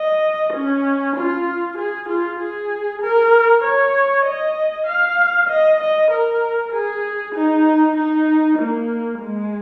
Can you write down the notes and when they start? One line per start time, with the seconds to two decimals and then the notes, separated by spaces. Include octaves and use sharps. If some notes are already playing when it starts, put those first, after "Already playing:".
Already playing: D#5
0.54 C#4
1.16 F4
1.78 G#4
2.09 F4
2.40 G#4
3.02 A#4
3.64 C#5
4.26 D#5
4.87 F5
5.49 D#5
5.80 D#5
6.11 A#4
6.73 G#4
7.35 D#4
7.97 D#4
8.59 A#3
9.21 G#3